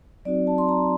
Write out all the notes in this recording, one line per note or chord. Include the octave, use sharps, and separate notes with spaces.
F#3 C4 D#4 F#4 D5
A5
C6
A#5